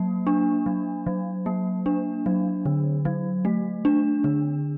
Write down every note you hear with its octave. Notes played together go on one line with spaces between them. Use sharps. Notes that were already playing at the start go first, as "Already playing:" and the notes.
Already playing: F#3 A#3
D4
F#3
F#3
A#3
D4
F#3
D3
F#3
A3
D4
D3